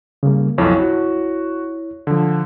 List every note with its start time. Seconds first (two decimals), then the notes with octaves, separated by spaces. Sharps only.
0.23 C#3 G3 A#3
0.58 B1 F2 E4 C#5
0.80 F#4
2.07 D3 F3